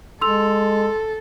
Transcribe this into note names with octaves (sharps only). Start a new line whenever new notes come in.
G#3 A4 C6 E6 F7